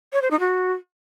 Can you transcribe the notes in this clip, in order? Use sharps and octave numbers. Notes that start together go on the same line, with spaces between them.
C#5
C5
D#4
F#4